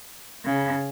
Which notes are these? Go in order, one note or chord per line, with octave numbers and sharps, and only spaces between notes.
C#3